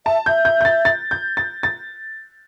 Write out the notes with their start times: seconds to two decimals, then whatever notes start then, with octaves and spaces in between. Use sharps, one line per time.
0.06 E5 A5
0.26 E5 G6
0.45 G6
0.61 G6
0.65 A6
0.85 A6
1.11 G6
1.37 A6
1.63 A6